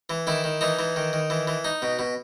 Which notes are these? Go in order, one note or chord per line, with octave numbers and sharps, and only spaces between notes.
E3
D#3 E4
D#3
E3 D#4
E3
D#3
D#3
E3
E3
D#4
B2
B2